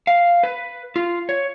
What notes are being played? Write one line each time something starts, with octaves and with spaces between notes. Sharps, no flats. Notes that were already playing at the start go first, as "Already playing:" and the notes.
F5
B4
F4
C#5